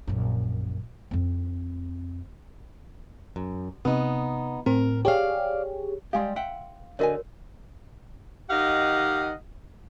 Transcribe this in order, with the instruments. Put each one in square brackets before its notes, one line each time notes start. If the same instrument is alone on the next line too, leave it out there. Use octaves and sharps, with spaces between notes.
[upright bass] A#1 F#2
F2 C4
[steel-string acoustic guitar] F#2
[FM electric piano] C3 [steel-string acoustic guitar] B3 D#4
[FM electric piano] A2 C4 [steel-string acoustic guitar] A#4
[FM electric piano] G4 G#4 C#5 [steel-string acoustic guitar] D5 F5
[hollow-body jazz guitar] G3 G#3 G4 [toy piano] F5 C6
[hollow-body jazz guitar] E5 F#5 G5
[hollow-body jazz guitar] D3 D#5 G#5 [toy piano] F#4 A#4 C#5
[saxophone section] D#3 G4 D#5 F5 F#5